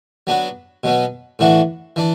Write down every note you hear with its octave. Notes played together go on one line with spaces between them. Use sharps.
F#3 B3 D4 F#4
B2 F#3 B3
A2 E3 D4 F#4
E3 D4